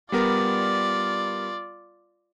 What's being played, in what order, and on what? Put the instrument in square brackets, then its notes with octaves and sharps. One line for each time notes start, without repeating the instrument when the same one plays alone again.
[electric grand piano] G3 B3 A#4 [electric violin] F4 D5